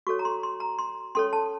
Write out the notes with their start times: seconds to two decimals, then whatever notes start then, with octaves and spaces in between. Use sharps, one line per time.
0.07 F#4 A4 C#5 C#6
0.19 A#5
0.25 C6
0.43 C6
0.60 A#5
0.79 C6
1.15 C#4 A4 C#5 C6
1.33 A5